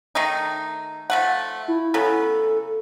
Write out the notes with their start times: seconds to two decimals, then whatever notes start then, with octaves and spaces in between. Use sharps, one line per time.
0.15 D#3 A3 D#4
1.10 F3 A3 F#5
1.68 E4
1.94 C#3 F#3 B3 A4